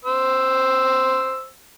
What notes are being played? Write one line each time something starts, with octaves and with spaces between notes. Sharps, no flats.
C5 E6